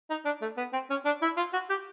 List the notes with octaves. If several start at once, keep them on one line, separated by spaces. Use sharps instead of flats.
D#4
D4
A3
B3
C4
C#4
D4
E4
F4
F#4
G4